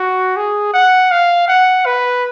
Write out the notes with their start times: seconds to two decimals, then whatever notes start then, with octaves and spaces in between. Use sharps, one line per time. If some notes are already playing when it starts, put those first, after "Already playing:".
Already playing: F#4
0.37 G#4
0.74 F#5
1.11 F5
1.48 F#5
1.86 B4